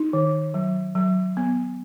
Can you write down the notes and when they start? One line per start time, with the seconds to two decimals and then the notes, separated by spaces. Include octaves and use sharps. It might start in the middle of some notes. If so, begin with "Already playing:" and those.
Already playing: D#4
0.13 D#3
0.54 F#3
0.95 F#3
1.37 B3